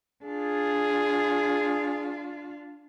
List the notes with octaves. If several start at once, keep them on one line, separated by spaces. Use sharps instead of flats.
D4 F4 G#4